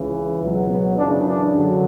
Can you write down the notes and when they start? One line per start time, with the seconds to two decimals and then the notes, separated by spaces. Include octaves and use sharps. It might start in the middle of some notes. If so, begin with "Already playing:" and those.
Already playing: C#2 C#3 E3
0.40 C#2 B2 F#3
0.69 B3
0.97 F#2 C#3 E3 D4
1.25 D4
1.53 F#2 D3 F#3